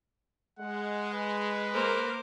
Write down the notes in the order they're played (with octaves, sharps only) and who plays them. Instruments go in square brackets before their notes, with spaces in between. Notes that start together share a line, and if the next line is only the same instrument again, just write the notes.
[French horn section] G#3 [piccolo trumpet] F#5
[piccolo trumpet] B4
[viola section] A#3 A#4 [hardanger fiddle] C5 D6